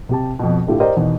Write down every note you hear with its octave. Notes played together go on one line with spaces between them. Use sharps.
C3 G4 A5
F2 B2
A2 D3 A3 E4 F4 G4
E4 G4 A#4 C5 D5 D#5
E2 B2 D#3